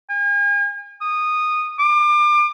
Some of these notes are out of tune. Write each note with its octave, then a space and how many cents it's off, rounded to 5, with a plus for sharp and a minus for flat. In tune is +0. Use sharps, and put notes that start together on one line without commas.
G#5 -40
D#6 -10
D6 +30